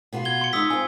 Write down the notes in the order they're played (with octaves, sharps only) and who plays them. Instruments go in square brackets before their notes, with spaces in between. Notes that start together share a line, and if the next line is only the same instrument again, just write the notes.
[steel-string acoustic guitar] B2 B3 F4
[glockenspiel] G#6 G7
C6 C#7
[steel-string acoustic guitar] G#3 D#4 [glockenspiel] D#6 E6 B6
[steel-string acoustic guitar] C4 F4 [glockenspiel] G#5